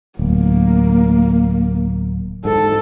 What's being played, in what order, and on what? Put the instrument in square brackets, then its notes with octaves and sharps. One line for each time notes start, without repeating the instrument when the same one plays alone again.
[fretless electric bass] D1 [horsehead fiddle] A#3
[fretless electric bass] G#2 [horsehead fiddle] A4